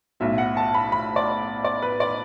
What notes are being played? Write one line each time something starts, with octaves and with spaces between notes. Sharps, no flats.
B1 A2 F#3 E5
F#5
A5
B5
B5
D5
D5
B4
D5